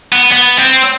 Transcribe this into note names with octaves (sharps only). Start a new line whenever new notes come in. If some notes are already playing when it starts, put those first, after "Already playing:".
B3
B3
C4